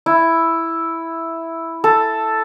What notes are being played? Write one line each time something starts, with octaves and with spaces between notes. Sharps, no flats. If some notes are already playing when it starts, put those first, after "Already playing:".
E4
A4